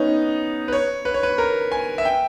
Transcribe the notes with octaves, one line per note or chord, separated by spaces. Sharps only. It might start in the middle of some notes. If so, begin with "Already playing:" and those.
Already playing: B3 C#4 D#4
B4
C#5
B4
C#5
B4
A#4
G#5
E5
G5